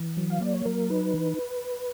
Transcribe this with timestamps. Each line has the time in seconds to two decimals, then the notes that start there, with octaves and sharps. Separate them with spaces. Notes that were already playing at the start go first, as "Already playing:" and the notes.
Already playing: E3
0.17 F#3
0.30 F5
0.41 A#3 D5
0.54 C#5
0.65 F#3 A#4
0.90 D#4 B4
1.14 E3